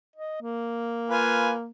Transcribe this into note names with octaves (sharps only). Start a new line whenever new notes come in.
D#5
A#3
F4 B4 G#5